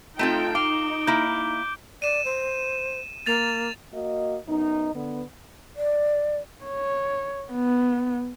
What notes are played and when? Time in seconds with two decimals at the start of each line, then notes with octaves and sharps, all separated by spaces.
0.19 A3 C4 D#4 F4 A4 G5
0.55 D#4 F5 D6 D7 G7
1.07 A#3 E4 G6
2.02 D5 D#7 E7
2.25 C5
3.26 A#3 A6 F7
3.93 A#3 F#4 D#5
4.47 F#2 B3 D#4
4.94 D3 B3
5.76 D5
6.64 C#5
7.51 B3